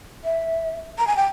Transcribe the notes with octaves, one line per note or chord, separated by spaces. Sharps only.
E5
A#5
G#5
G5